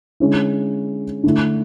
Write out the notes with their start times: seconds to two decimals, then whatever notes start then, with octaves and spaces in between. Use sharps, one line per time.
0.20 D3 G#3 C#4 E4
1.24 D3 A3 E4